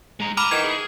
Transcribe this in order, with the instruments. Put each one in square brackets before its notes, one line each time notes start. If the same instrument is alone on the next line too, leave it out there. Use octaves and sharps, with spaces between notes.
[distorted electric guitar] G#3 A#5
[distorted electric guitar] G#5 A#5 [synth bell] B5 D6 F6
[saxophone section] D#3 E3 [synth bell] G#6
[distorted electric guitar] G#4